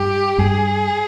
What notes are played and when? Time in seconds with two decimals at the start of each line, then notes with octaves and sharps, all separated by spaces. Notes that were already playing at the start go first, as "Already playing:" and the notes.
Already playing: G2 G4
0.38 G2 G#4